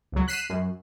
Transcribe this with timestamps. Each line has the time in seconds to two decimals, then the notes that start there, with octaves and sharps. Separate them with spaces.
0.12 C#2 F#3
0.28 F#6 B6 C7 D#7 E7
0.50 F#2